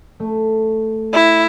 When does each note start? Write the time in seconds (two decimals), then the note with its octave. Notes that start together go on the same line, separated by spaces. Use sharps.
0.20 A3
1.14 E4